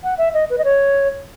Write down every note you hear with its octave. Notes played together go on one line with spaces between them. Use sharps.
F#5
E5
D#5
B4
D#5
C#5